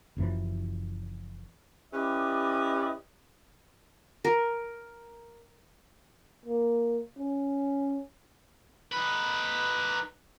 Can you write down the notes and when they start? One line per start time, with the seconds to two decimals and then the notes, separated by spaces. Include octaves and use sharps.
0.17 F#1 F#2 E3 F3
1.93 C#4 E4 G4 B4 D5 D#5
4.25 A#4
6.46 A#3
7.19 C#4
8.92 D#4 B4